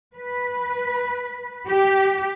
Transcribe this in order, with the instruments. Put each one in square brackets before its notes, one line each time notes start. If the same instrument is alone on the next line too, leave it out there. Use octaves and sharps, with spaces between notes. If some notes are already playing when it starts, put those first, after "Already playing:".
[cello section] B4
G4